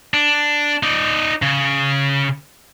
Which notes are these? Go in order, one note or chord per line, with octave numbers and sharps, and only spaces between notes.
D4
D#4 D5
C#3